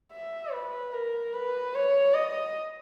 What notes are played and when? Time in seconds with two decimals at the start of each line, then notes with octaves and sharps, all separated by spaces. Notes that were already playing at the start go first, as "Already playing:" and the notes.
0.12 E5
0.53 B4
0.93 A#4
1.33 B4
1.75 C#5
2.14 D#5